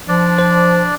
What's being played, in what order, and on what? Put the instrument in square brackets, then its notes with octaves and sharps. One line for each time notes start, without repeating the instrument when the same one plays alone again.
[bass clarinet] F3 [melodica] D4 D5
[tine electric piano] C5